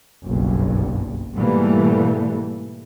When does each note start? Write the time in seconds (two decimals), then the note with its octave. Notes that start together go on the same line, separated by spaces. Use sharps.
0.26 F#1 B1 G2
1.36 G#2 B2 E3 G3 A3 A#3